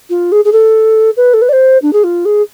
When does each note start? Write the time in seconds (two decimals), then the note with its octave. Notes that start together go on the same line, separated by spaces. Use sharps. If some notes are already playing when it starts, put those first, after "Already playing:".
0.09 F4
0.32 G#4
0.44 G#4
0.52 A4
1.17 B4
1.33 A4
1.41 B4
1.49 D5
1.52 C5
1.82 D4
1.93 G#4
2.04 F4
2.25 G#4